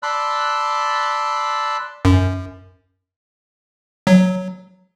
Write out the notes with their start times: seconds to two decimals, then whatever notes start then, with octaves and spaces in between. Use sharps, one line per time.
0.03 D5 A5 B5 C6 E6 F#6
2.05 F#2
4.07 F#3